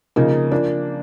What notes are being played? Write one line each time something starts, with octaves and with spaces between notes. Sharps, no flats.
C#3 F3 A#3 D#4
F3 A#3 D4